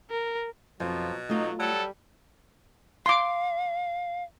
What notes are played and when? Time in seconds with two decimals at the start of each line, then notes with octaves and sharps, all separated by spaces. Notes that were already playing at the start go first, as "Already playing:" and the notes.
0.10 A#4
0.80 F2 B2 F3 F#3
1.30 F#3 A3 D#4 F4
1.59 F#3 G3 A4
3.06 F5 C6 D6